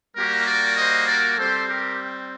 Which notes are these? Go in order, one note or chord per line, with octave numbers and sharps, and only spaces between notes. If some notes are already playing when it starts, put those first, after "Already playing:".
G3 A#3 F#4 G4 A#4
A#4 D5
C5 D#5
A#4 D5
G3 C4 G4 A4 C5
G4 A#4